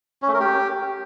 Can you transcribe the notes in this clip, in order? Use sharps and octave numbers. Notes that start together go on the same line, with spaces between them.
C#4
A3
A#4
G4